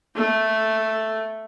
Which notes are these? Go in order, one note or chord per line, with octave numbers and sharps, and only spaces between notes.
A3